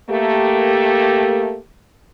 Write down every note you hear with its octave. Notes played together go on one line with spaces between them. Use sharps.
A3 A#3 G4